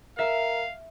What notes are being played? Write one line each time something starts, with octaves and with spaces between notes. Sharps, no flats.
A#4 E5 F5